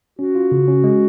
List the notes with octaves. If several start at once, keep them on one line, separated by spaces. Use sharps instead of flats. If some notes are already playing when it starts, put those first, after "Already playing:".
C#4 F#4
F4
C#3
C#4
G#3